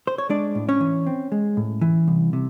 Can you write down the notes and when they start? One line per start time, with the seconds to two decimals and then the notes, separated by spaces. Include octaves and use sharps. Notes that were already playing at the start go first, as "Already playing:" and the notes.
0.07 C5
0.18 C#5
0.29 G#3 D4 D5
0.55 A2
0.69 C#4 C#5
0.81 E3
1.07 C4
1.32 G#3
1.57 A2
1.81 E3
2.08 C2
2.33 C3